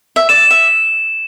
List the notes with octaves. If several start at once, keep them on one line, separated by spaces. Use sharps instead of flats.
E5
D5 E7
E5